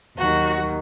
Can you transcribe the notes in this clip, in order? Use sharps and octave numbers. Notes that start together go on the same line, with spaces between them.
D#2 D#3 F#3 F#4